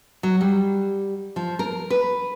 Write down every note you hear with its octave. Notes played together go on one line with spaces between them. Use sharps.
F#3
G3
F3
A#4
B4